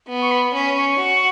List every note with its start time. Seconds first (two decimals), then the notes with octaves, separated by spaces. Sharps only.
0.08 B3
0.22 C#6
0.31 B5
0.54 C#4 B5
0.77 C#6
0.99 F#4